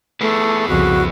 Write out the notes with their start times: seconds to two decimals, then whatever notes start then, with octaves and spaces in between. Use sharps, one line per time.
0.21 A3 B3 G#4 B4
0.68 C2 F2 C#3 F#4